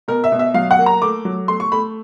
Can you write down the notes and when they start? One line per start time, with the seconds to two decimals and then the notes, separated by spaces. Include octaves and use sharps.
0.08 B2 A#4
0.24 E5
0.32 B2
0.39 E5
0.54 F#3 F5
0.71 F#5
0.79 A#3
0.86 A#5
1.02 A3 D6
1.25 F#3
1.48 A3 C6
1.60 C#6
1.72 A3 B5